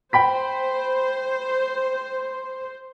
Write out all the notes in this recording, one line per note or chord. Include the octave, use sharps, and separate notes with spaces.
C5 G5 B5 B6